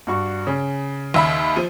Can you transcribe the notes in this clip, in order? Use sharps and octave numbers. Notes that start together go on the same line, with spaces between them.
G2 F#4 C#6
C#3
D#2 E5 B5
F3 D#7